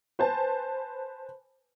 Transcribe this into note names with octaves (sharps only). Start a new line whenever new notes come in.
B4 C5 G#5 A5